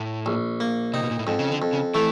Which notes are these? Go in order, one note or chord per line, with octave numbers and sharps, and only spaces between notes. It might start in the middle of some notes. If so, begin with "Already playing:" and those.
Already playing: A2
A#1
A#3
C3 D#4
B2
A#2
A2
F2 G#2
C#3
D3
F2
C#3
E3 A3